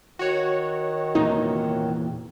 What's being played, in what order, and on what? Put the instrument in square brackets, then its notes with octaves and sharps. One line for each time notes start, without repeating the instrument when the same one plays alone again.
[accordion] D#3 [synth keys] F#4 C#5
[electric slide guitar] E2 A#2 E3 [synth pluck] D#4